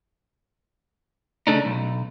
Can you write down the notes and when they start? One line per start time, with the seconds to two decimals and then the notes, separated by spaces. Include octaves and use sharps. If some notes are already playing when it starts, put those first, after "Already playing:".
1.47 C#3 A3 D4 D#4
1.65 B1